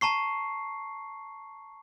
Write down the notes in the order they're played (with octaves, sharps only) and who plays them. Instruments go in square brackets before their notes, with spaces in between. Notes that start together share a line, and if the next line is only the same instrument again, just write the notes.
[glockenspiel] A5 A#5 C#6 C7